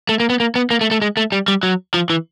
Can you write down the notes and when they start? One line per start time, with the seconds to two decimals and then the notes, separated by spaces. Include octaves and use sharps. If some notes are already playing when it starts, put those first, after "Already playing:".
0.09 A3
0.20 A#3
0.30 B3
0.40 A#3
0.56 B3
0.71 A#3
0.81 A3
0.91 A3
1.02 G#3
1.17 A3
1.32 G3
1.48 G3
1.63 F#3
1.94 F3
2.10 E3